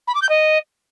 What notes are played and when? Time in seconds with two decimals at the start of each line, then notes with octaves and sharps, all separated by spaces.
0.08 B5
0.15 D6
0.22 G6
0.29 D#5